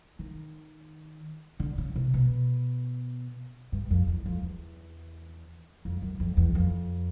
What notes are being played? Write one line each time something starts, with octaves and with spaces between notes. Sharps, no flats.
D#3
D3
C#3
C3
B2
G2
F2
E2
F2
E2
F2
F#2
F2
E2
F2